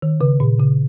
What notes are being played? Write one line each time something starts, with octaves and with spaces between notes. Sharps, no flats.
D#3
C#3
A#2
C#3